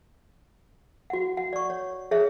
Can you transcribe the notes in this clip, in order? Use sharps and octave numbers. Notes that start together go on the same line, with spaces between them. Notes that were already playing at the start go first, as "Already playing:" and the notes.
F#4 F#5
F#5
D5 C#6
C#5
G#4 C#5 E5